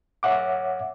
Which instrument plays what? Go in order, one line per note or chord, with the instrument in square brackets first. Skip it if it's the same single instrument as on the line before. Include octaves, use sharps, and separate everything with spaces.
[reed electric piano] C#5 E5 F#5 D6